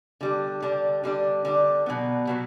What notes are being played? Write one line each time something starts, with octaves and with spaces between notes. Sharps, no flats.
D3 G3 D4
D3 G3 D4
D3 G3 D4
D3 G3 D4
B2 F#3 B3
B2 F#3 B3